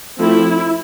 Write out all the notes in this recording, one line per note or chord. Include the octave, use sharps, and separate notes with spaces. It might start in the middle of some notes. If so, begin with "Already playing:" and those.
F3 A3 C4 E4